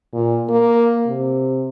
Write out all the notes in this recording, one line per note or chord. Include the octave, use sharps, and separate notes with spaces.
A#2
A#3
C3